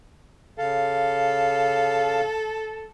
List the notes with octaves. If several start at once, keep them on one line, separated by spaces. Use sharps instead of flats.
C#3 A4 F5